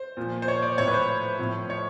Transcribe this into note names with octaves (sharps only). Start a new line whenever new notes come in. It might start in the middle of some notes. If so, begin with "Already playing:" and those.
Already playing: C5
A#2 F3
C5
C#5
D5
A2 F3 C#5
B4
C5
A2 F3
C#5